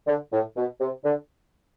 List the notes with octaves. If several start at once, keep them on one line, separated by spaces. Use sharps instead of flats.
D3
A2
B2
C3
D3